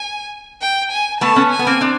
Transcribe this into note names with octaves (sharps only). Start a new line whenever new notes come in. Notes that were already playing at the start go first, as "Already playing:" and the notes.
Already playing: G#5
G5
G#5
A3 B3 A5
B3 C#4
G#5
B3
A#3 C4
C4 D4